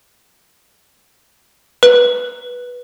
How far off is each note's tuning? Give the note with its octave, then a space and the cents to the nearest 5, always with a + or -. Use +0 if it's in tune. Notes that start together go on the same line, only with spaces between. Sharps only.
B4 -10